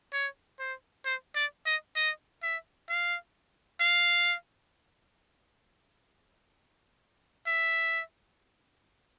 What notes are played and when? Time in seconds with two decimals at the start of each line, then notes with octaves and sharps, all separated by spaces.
0.13 C#5
0.59 C5
1.05 C5
1.35 D5
1.66 D#5
1.96 D#5
2.43 E5
2.89 F5
3.80 F5
7.47 E5